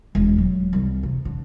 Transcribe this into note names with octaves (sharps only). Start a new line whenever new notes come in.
E1
F#3
C2
C3
D3